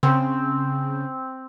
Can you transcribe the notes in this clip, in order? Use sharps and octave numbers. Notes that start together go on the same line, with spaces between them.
C#3 C4